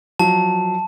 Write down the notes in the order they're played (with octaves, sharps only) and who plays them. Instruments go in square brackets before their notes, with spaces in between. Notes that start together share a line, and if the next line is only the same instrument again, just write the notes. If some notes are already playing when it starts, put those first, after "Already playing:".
[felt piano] F3 F#3 [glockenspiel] A5